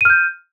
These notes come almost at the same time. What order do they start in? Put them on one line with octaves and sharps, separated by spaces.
D#7 F6 G6